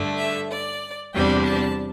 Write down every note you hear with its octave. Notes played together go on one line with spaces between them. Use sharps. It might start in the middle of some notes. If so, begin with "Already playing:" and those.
Already playing: G2 D3 A3
E5
D5
E2 C3 G3 D4 G5
A5